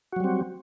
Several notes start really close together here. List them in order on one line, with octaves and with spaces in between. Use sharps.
F#4 F#3 G3 C4